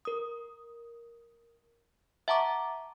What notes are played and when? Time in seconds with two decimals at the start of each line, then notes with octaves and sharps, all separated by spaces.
0.05 A#4 D#6
2.28 E5 F#5 A5 A#5 C#6 D6